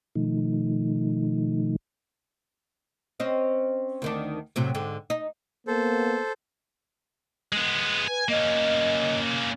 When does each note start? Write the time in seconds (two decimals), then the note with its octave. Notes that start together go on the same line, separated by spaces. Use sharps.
0.16 B2 D#3 F3 A3 D#4
3.20 C4 C#4 D#5
4.02 D2 D#3 D4
4.56 A2 C3 F#3
4.75 G#2 D3
5.10 D#4
5.67 A#3 B3 A4 C5
7.52 G#3 B3
8.08 B4 G#5
8.29 A#3 C#4 D#5